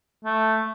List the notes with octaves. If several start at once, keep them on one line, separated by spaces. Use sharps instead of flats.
A3